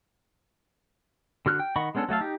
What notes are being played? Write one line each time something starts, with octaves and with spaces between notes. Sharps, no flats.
D3 F#4 F6 F#6
G5
D#3 D#5 F#5 B5 C#6
G#3 B3 C#4 D4 A4
F#3 A3 A4 F5
D#4 G4